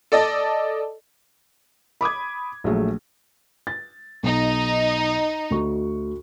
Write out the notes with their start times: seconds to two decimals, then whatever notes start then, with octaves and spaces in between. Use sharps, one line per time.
0.12 A4 D5 D#5
2.01 B5 D6 D#6 G#6
2.64 A#1 F#3 A3 G#4
3.67 A6
4.23 B1 D#4
5.51 D2 F#4 C#6